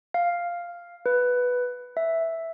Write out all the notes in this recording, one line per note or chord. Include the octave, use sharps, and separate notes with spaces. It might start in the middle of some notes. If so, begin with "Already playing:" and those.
F5
B4
E5